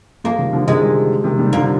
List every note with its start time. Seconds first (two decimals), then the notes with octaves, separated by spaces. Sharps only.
0.24 F3 G#3 A#3
0.39 D#3 G3
0.53 D3 F3
0.67 C3 D#3 G#3
1.24 C3 D#3
1.39 D#3 G3
1.53 D3 F3 A#3